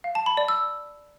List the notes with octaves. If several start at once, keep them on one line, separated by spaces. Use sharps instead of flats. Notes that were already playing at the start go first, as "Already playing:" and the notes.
F5
A5
B5
D5
E6